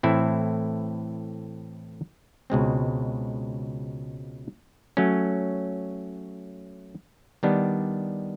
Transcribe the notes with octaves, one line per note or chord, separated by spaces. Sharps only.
A2 E3 A3 C4 E4
C#2 B2 G#3 C4
F#3 A3 C#4
D#3 G3 B3 D4